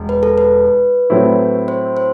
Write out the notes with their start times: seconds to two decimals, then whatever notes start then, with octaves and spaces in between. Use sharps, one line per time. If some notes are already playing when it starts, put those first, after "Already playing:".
Already playing: E1
0.09 B4
0.23 A4
0.38 B4
1.10 A2 F#3 A3 C4 E4
1.68 C5
1.97 C5